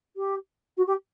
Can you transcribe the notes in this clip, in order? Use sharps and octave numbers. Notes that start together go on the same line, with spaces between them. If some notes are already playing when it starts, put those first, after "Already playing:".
G4
F#4
G4